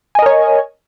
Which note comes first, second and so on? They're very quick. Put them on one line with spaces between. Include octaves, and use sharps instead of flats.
G#5 D#5 A#4 C#5